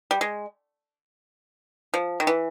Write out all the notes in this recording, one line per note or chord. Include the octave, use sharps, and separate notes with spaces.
G3
G#3
F3
D#3
E3